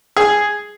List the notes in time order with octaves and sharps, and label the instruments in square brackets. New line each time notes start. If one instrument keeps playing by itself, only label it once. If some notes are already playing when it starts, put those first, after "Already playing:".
[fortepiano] G#4